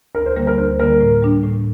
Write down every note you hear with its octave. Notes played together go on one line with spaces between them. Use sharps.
D2 A#4
C5
D3 G3 A#3 A#4
A#4
D2 C5
D3 G3 A#3 A#4
A2
G3 D4
A2